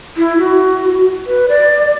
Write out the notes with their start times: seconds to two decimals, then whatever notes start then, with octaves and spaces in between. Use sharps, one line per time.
0.17 E4
0.39 F#4
1.26 B4
1.49 D5